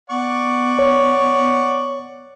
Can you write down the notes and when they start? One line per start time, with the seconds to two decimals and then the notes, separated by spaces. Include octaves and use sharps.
0.10 B3 D5 F#5 C#6
0.79 C#5